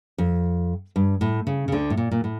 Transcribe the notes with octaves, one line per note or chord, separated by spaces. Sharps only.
F2
G2
A2
C#3
C#3
D2 D3
A2
A#2
A#2
A2